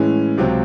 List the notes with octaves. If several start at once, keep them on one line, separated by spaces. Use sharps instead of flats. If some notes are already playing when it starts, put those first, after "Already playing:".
Already playing: A2 E3 G#3 C#4
C#2 C3 F#3 C4